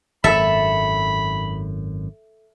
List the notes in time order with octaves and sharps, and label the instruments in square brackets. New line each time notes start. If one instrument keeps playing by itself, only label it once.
[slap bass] G#1 F#2 [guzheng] A4 E5 [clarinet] B5